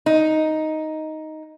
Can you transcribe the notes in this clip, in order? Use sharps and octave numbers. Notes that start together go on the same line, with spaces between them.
D#4